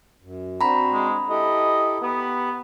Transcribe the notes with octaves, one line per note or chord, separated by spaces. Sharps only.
F#2
C4 D4 F#4 A#5 B5
G#3
E4 G4 A4 D#5
B3 G4 B4 F#5